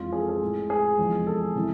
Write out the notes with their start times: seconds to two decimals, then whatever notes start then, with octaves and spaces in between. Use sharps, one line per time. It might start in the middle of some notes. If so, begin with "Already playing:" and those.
Already playing: F2 E3 G#3 F4
0.12 G#4
0.21 A4
0.29 G#4
0.42 A2 G#3
0.70 G#4
0.98 E2 C3 F3 G#3
1.27 A4
1.56 C3 E3 G#3